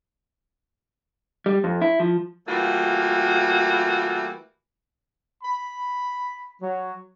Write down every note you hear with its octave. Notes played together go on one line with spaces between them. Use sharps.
G3
F2
E4
F3
E3 G3 A3 A#3 F4 F#4
B5
F#3